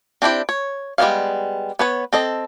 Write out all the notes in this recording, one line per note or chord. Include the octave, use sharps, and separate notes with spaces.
C4 D4 E4 G4
C#5
G3 G#3 B3 C#4 F5
B3 B4 C#5
C4 A4 D#5